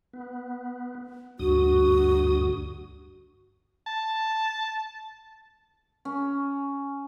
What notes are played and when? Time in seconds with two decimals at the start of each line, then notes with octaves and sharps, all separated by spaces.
0.13 B3
1.39 D2 G2 F#4 D#6
3.86 A5
6.05 C#4